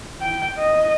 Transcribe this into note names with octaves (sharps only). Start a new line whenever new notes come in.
G5
D#5